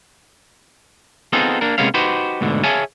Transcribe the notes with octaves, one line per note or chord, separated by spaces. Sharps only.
B3 C4 D#4 F4 G#4 A4
A#3 D4 A#4
C3 G#3 A#3 B3 C#4 F5
D#4 F#4 G4 B4 C5
D2 G#2 B2 D3
G#4 C#5 E5 F5 G#5 A5